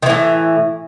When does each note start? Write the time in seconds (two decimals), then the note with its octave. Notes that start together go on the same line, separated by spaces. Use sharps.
0.03 D#3
0.06 E3
0.10 A2